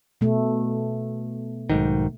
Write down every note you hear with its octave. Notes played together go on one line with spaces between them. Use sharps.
B2 A3
B1 G#2 D#3